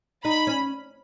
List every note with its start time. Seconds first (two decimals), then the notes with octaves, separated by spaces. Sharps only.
0.25 D#4 B5
0.47 C#4